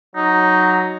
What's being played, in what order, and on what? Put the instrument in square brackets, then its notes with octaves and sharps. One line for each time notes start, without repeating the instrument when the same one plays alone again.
[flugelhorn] F#3 [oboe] D#4